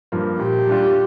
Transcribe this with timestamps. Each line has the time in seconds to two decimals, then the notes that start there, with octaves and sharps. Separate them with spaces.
0.12 G2 F3 A#3
0.39 A#2 G4
0.67 G3 D4 F4